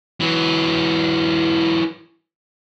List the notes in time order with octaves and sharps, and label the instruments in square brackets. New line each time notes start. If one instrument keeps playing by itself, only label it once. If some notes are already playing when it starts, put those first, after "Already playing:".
[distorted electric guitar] E3 F#3